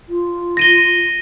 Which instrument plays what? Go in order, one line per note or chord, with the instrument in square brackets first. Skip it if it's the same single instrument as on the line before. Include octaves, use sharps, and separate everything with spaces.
[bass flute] F4
[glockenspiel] A#6 D#7 G7